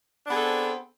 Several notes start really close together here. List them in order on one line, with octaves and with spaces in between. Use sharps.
D4 B3 G#4 A4 C4